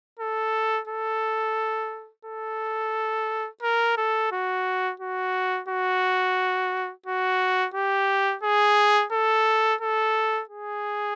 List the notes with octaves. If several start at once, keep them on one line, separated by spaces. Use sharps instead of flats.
A4
A4
A4
A#4
A4
F#4
F#4
F#4
F#4
G4
G#4
A4
A4
G#4